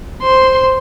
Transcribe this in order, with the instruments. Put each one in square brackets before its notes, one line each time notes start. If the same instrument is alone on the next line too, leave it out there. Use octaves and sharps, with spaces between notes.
[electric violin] C5 C6